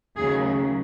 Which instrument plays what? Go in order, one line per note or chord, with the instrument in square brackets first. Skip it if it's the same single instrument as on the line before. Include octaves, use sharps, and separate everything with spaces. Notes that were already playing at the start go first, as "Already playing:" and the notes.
[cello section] D#2 C#3 F#3 A3 G#4